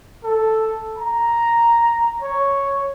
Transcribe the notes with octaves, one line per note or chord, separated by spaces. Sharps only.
A4
A#5
C#5